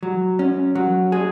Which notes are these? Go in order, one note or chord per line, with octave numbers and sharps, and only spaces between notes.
F#3
C#4
F#3
G#4